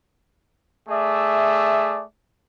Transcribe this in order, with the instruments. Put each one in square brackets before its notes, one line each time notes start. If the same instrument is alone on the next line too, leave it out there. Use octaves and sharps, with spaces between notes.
[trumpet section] A3 G#4 D5 E5